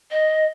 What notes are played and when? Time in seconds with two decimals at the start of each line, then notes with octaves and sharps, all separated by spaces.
0.10 D#5